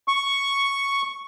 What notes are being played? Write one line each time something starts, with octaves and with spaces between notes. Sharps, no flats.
C#6